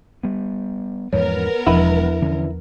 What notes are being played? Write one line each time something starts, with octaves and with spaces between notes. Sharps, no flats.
G3 B3
E2 G#2 F3 B3 A#4 C#5
E1 E2 F3 E4 B4
D3 E3 C#4